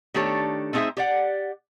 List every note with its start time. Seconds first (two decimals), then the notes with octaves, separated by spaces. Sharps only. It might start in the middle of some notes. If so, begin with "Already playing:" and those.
0.14 D#3 A3 D4 G4 A4 C#5
0.73 A3 C4 D#4 G#4 C5 E5
0.97 G4 D5 F#5